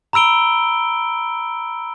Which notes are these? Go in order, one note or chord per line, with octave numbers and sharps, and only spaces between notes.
A#5 B5 E6 D7 G7